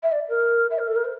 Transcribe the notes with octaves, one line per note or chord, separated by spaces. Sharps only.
E5
D5
A#4
E5
A#4
A4
A#4
C5